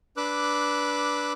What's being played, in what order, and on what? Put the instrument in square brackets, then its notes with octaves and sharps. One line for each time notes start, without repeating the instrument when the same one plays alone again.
[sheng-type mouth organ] D4 B4 D6 E6 F#6